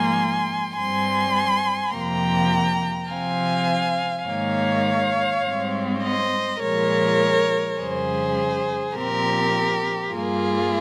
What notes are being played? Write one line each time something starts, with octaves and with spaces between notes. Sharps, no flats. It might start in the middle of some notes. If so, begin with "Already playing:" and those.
Already playing: G#2 F3 A#3 G#5 C6
G2 G3 C4 G#5 C6
F2 C3 F3 A#3 G5 A#5
C3 F3 C4 F5 G#5
G#2 D#3 A#3 C#5 F5
G#2 G3 C4
C5 D#5
A#2 F3 G#3 A#4 C#5
F2 C#3 G3 G#4 C5
A#2 F3 C4 G4 A#4
G2 G3 A#3 F4 G#4